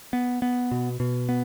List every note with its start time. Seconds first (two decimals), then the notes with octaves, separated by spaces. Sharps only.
0.13 B3
0.42 B3
0.71 B2
1.00 B2
1.29 B3